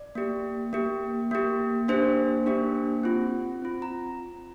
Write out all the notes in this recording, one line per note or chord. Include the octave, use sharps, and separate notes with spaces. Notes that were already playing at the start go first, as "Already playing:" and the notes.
Already playing: D5
A#3 G4
A#3 G4
A#3 G4
A#3 D4 G4 C5
A#3 D4 G4
C4 F4
C4 F4
A#5